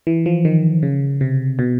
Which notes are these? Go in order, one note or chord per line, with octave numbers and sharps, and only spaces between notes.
E3
F3
D#3
C#3
C3
B2